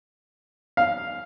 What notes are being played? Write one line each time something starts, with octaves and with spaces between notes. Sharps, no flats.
F5